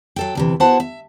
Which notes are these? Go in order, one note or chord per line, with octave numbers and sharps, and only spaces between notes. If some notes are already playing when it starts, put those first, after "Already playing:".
F#3 A4 G5
D2 C3 E3
B3 E4 F#4 C5 F#5 A5
E5